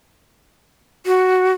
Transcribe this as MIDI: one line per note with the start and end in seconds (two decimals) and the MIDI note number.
1.06 1.53 66